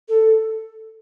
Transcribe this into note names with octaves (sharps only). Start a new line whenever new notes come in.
A4